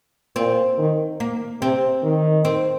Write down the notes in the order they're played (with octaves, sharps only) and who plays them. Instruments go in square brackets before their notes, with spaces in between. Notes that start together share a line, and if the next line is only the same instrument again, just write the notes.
[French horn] A#2 [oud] C4
[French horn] D#3
[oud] A#3
[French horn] C3 [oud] C4
[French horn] D#3
[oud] C4